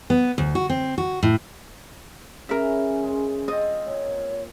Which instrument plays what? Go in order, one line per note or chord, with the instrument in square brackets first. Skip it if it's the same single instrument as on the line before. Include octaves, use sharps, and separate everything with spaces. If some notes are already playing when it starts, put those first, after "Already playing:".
[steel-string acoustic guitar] B3
D2
F#4
C4
F#4
A2
[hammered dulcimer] C#3 E3 [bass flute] C#4 [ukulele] A#4 E5
[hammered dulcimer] G#3
[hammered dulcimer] C4 F4 [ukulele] D#5
[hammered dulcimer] A#2 [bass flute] C#5